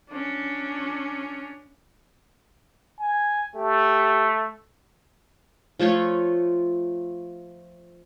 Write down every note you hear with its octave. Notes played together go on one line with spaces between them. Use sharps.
C#4 D4
G#5
A3 G4
F3 A3 F4 C#5